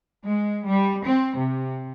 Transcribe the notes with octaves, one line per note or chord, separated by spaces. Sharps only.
G#3
G3
C4
C3